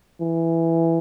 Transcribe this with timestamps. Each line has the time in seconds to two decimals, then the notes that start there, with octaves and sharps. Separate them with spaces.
0.21 E3